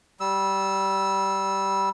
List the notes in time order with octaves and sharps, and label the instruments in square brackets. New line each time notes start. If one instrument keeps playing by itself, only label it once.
[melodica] G3 E6